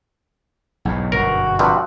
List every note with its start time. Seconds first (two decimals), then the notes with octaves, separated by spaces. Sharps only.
0.85 B1 E2 G#2
1.12 G1 F#2 B2 F#4 A#4
1.59 G2 C3 F3